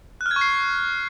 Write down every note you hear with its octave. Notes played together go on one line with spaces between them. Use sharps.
F#6
F6
G#6
C#6
C7